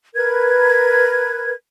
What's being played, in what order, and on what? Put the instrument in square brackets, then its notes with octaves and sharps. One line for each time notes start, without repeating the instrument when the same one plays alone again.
[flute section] A#4 B4 G#6